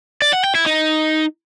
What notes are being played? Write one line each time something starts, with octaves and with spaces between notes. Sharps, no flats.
D5
F#5
G5
E4
D#4